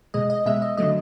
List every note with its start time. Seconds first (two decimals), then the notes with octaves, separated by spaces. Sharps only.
0.14 B2 G#3 D#5
0.30 D#5
0.46 B2 G#3 E5
0.62 D#5
0.77 D3 F#3 A3 D#5